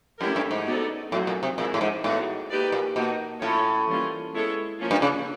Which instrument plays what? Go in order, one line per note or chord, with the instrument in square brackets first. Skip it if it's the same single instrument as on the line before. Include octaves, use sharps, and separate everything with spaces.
[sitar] F#2 [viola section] A3 C#4 E4 G4 A#4
[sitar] G2
G#2
[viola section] B3 D#4 F#4 A4 D5
[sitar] A2 [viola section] F#3 A3 C4 D#4 F#4
[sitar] A#2
C3
[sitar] A#2 [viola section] E3 G#3 C4 E4
[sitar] A2
G#2
[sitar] A2 [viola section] G#3 B3 D#4 F#4
[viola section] A#3 D#4 G4 B4 D5
[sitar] A#2
[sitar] B2 [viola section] A#3 D#4 F#4
[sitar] A2 [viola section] C#4 F4 A4 C#5
[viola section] E3 G3 A#3 C#4 F4
G#3 B3 E4 A4 C#5
F3 A#3 C#4 F4
[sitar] G2
C#3